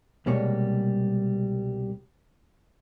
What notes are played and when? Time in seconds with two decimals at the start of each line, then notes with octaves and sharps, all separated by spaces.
0.26 C2 B2 G3 G#3 A#3 C#5